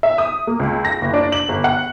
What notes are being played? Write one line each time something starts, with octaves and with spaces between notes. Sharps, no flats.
E5
D#6
A#3
C#2
A#6
F#1
D4
F#7
G1
F#5